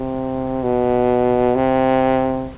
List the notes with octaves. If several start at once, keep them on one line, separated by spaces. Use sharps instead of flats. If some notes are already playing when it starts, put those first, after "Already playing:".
Already playing: C3
B2
C3